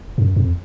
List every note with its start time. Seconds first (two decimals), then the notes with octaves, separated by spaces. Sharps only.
0.18 F#2
0.36 F2